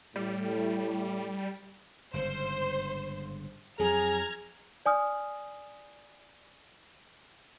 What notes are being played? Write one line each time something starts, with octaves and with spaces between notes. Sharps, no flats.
A2 G3
G1 G#2 C#3 C5
F2 F#3 G#4 A#5 F6 G#6
D5 G#5 D#6 F6